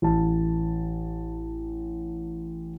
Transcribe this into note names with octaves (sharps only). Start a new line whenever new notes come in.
A1 A5